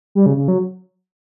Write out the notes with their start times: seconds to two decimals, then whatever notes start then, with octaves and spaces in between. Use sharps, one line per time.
0.15 G3
0.26 C#3
0.37 C#3
0.48 F#3